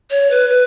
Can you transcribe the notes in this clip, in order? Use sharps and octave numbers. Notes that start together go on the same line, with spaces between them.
C#5
B4
B4